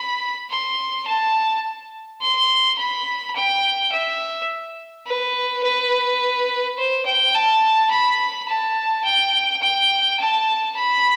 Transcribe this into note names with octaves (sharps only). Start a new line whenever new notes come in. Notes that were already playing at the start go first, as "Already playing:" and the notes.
Already playing: B5
C6
A5
C6
B5
G5
E5
B4
B4
C5
G5
A5
B5
A5
G5
G5
A5
B5